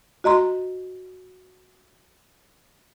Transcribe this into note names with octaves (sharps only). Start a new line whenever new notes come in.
F#4 D#5 A#5 C6